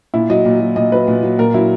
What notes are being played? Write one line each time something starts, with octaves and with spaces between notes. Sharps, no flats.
A#2 E4
F#3 D#5
A#2
F#3
A#2 D#5
F#3 B4
A#2
F#3
A#2 A#4
F#3 E4